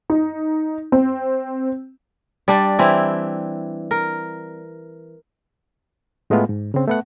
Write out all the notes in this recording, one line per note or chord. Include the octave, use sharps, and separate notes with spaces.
D#4
C4
G3 D4
E3 C4 E4
A#4
A2 G#3 A3 B3 F4
G#2
C#3 C4
A3 B3 F#5